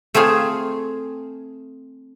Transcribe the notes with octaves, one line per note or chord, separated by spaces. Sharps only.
A3 C4 F4 G#4